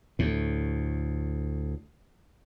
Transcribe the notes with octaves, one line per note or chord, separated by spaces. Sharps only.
D2 A2